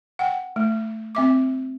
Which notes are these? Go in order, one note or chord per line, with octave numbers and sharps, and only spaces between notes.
F#5 G5
A3
C4 E5 D6